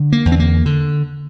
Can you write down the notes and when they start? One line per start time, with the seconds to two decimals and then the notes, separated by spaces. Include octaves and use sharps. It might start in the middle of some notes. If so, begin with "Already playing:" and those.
Already playing: D3
0.12 A#3
0.25 E2
0.32 C4
0.40 A#3
0.66 D3